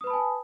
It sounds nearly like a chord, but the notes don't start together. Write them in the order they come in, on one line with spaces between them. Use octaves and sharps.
D#6 B4 B5 A5 G#5